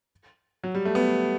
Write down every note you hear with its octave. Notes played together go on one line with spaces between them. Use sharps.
F#3
G3
A3
B3